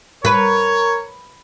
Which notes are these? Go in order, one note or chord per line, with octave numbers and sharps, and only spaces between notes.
A#4 B4 C#5